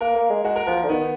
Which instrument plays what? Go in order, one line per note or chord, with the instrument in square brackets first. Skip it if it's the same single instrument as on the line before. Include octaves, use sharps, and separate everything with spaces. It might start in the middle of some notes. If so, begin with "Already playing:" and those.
[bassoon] A#3 [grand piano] A#4
[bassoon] A#3
G#3
[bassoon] G#3 [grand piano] F#4
[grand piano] A#4
[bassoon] F3 [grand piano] A#4
[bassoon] D3
[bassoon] D#3 [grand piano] B3